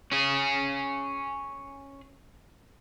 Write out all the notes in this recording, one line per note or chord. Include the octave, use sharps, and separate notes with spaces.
C#4 G#4